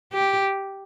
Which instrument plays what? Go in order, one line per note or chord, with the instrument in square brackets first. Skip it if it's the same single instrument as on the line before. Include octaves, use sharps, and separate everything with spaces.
[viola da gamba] G4